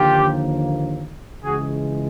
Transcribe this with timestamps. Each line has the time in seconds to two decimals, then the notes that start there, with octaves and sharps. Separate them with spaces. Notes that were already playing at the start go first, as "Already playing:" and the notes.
Already playing: D#2 D3 F3 A#3 F4 G4
1.43 C#2 C#3 E3 G#3 F#4 G#4